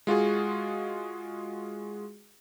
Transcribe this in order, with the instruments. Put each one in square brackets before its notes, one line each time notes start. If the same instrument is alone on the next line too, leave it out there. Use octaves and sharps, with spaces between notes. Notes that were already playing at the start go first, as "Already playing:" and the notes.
[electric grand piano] G#3 F4 F#4 G#4